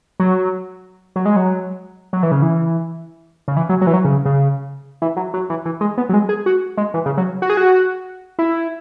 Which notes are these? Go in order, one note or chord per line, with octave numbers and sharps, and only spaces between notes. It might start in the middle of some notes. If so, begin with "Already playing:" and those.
F#3
F#3
G#3
F#3
F#3
E3
C#3
E3
C#3
E3
F#3
F#3
E3
F#3
C#3
C#3
E3
F#3
F#3
E3
E3
G#3
B3
F#3
G#3
G#4
F#4
G#3
E3
C#3
F#3
F#4
G#4
F#4
E4